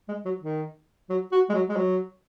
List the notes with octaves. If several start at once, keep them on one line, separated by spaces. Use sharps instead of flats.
G#3
F#3
D#3
F#3
F#4
G#3
F#3
G#3
F#3